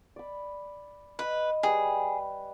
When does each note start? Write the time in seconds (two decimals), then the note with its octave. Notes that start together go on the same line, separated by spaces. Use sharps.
0.16 D5 B5
1.19 B4 D#5 B5 D#6
1.63 G3 G#4 B4 G#5